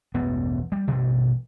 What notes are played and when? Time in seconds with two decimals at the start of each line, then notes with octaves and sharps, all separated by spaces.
0.15 E1 A1 G2 B3
0.72 G3
0.87 A1 G2 B2